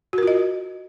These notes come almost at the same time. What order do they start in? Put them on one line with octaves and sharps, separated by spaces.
F#4 A#4 F4 D#5